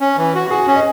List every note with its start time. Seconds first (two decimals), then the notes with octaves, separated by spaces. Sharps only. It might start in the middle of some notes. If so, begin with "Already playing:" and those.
0.01 C#4
0.17 E3
0.35 F#4
0.50 F#4 G#4
0.67 C#4
0.76 D#5